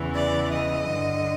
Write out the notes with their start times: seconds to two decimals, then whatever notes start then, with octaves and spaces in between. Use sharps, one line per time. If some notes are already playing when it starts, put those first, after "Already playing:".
Already playing: E2 C#3 E3
0.15 D5
0.53 D#5
0.89 G2 D3